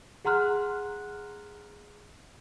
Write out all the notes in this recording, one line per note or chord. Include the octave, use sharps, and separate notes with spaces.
G#4 F#5 A#5 C6 F6 F#6